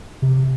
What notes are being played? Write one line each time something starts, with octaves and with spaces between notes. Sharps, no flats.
C3